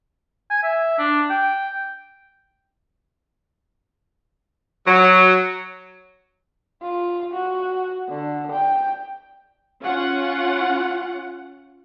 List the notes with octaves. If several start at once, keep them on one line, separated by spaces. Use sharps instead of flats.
G#5
E5
D4
G5
F#3
F4
F#4
D3
G5
C#4 F4 F#5